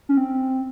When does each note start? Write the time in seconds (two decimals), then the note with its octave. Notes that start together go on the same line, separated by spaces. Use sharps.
0.09 C#4
0.17 C4